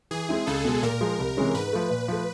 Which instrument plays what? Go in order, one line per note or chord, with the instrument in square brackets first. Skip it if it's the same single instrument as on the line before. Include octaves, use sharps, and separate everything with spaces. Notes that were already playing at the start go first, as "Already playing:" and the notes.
[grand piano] E3 [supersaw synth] G#4
[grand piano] G#3 C4 E4
[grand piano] C#2 [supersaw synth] A4
[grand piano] B2 G#3
[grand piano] A#2 [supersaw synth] A#4
[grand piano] F3 G#3
C2
C3 E3 G#3 C#4
[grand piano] G#2 [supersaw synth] B4
[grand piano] F3 A3
A#2
F3 A3